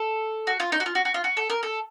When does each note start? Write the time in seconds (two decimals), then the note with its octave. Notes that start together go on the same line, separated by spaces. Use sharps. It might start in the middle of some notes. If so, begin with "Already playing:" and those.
Already playing: A4
0.47 F#4
0.60 F4
0.72 D#4
0.80 F#4
0.86 F4
0.95 F#4
1.05 F#4
1.14 F4
1.24 F#4
1.37 A4
1.50 A#4
1.63 A4